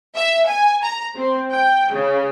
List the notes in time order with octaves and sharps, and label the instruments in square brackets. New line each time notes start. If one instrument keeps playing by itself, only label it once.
[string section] E5
G#5
A#5
C4
G5
C#3